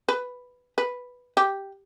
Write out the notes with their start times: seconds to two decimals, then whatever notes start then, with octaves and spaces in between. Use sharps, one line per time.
0.09 B4
0.78 B4
1.37 G4